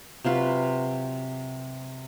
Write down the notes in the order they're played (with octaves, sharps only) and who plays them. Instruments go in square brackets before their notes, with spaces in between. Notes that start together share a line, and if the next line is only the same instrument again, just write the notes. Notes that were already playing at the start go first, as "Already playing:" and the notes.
[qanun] C3 F#3 F4 B4